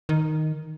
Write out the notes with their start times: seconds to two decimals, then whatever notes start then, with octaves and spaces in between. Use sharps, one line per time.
0.09 D#3